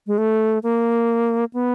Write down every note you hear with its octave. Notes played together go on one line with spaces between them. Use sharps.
G#3
A3
A#3
B3